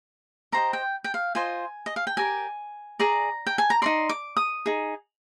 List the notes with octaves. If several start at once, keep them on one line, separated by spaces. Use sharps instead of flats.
G4 C5 D#5 A#5
G5
G5
F5
F4 C5 D#5 G#5
D#5
F5
G5
G4 A#4 D5 G#5
G#4 D5 A#5
G5
G#5
A#5
D#4 A#4 D5 C6
D6
D#6
D#4 G#4